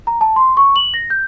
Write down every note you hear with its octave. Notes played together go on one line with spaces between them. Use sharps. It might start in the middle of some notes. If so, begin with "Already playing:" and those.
A#5
A5
C6
C#6
F#7
A#6
G6